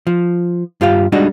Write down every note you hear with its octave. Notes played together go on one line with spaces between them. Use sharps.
F3
G2 F4 G4 F5
G3 G#3 D4 D#4 F#4